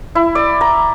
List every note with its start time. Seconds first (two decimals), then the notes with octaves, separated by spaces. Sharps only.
0.15 E4
0.35 D5
0.61 A#5